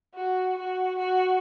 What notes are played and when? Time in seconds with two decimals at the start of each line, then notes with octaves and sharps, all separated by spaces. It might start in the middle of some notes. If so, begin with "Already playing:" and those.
0.15 F#4
0.58 F#4
0.99 F#4